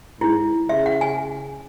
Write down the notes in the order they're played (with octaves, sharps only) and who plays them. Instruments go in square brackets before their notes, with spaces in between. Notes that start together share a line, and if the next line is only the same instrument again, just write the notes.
[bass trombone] G#2 [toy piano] E4
[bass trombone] C#3 [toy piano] E5
[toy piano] F#5
G#5